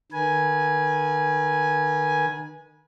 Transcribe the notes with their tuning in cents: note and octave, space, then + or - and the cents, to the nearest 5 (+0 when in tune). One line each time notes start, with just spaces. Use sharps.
D#3 -40 B4 -35 G#5 +0